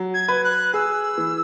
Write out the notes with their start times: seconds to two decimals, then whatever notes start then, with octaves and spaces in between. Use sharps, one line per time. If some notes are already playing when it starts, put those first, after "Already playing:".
Already playing: F#3
0.14 G#6
0.28 B4
0.44 F#6
0.74 G#4 E6
1.18 E3